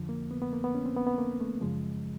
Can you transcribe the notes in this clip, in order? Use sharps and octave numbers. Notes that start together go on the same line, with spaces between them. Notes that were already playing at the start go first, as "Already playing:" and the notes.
Already playing: F2 D3 F3
A#3
B3
B3
A#3
B3
C#4
C4
B3
B3
A#3
A3
F#2 C#3 F3 G#3